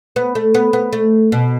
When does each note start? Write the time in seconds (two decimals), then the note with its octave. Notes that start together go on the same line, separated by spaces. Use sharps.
0.16 B3
0.35 A3
0.54 B3
0.73 B3
0.93 A3
1.32 B2